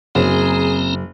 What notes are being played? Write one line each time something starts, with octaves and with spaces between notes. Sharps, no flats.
F#1 F#3 C4 G#4 A#5